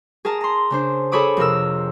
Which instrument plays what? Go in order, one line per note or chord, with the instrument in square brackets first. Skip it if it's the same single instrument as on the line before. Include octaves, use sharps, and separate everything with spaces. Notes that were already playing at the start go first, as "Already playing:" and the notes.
[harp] G#4 A#4 A5 A#5
A#5 C6
C#3 D4 C5
G#4 A4 C#5 B5 D6 D#6
F2 C3 A#4 E6